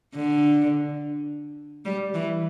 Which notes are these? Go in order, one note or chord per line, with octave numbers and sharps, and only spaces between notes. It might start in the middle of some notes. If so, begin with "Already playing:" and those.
D3
G3
E3